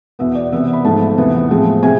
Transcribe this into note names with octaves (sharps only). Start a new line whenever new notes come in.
E2 B2 B3 E5
D5
C3 E3 B3 E5
B5
G#2 F3 A3 A5
E2 C3 E3 B3
A2 F3 G#3 C4
C3 G#3 G#5